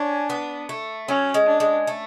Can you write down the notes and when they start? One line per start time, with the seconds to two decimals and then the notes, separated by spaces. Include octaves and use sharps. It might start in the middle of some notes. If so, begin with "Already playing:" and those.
Already playing: C#4 D4
0.30 B3
0.69 A3
1.08 F#3 C#4
1.34 G#3
1.47 D4
1.60 G#3
1.87 A3